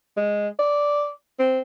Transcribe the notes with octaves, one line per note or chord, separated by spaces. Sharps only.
G#3
D5
C4